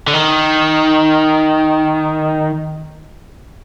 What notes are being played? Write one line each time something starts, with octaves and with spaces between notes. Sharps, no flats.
D3
D#3